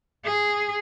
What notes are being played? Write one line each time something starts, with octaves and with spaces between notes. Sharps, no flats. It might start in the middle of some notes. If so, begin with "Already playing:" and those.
G#4